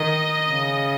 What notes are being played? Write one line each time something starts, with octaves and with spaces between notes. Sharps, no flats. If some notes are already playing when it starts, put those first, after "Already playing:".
Already playing: D#3 D#5
C#3